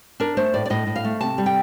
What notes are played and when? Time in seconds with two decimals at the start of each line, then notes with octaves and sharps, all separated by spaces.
0.20 D4 A#4
0.37 A3 C5
0.54 A2 D5
0.66 D5
0.70 A2 D#5
0.87 A2
0.96 F5
1.04 A3
1.21 C3 A5
1.38 G3
1.46 G5